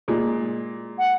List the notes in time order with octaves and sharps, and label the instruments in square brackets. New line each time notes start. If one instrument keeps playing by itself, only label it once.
[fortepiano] A#2 G#3
[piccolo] F#5